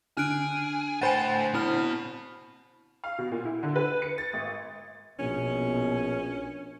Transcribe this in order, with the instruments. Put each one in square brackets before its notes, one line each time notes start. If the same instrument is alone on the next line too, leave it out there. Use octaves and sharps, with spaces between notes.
[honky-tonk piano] D3 [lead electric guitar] G#4 [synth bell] F6 F#6 D7
[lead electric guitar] A2 [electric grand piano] C5 F#5 [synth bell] G#5 B5 A6
[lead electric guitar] B2 [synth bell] C4 E4 F6
[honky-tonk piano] F5
B2
A#2
E4
D3
B4
C#7
A6
G#1
[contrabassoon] A#1 [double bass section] B2 [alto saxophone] C#4